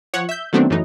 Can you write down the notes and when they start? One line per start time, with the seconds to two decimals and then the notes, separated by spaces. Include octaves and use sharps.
0.14 F3 C#5 F#5
0.29 E5 G6
0.53 D#3 F#3 A3 B3 C4 D4
0.70 F#2 A2 E3 D#4